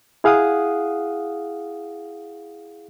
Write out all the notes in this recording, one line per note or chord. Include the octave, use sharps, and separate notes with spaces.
E4 G#4 F5 F#5 D#6